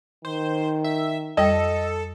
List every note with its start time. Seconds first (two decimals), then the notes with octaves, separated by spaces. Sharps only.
0.25 D#3 C5
0.84 E5
1.37 F2 G3 A4 D#5 G5